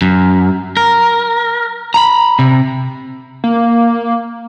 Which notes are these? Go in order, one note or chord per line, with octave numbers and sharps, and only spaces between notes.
F#2
A#4
A#5 B5
C3
A#3